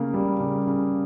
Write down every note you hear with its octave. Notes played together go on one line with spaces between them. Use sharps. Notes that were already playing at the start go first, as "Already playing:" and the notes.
Already playing: C#3 A#3
G3
C#3
C#3